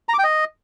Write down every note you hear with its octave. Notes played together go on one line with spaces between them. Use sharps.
A#5
D6
G5
D#5